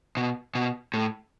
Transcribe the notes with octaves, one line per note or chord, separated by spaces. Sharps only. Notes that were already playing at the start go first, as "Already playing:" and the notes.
B2
B2
A2